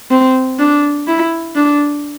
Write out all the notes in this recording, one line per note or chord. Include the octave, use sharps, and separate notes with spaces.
C4
D4
E4
D4